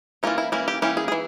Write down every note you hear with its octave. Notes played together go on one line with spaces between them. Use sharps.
E3 A#3 C#4 F4
E4
E3 A#3 C#4 E4
G4
E3 A#3 C#4 G4
G#4
G#4
E3